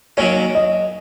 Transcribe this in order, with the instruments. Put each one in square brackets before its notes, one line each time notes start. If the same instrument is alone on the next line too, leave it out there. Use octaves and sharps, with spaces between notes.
[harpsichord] D#3 F#3 A#3 C#4 [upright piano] C#5
[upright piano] D#5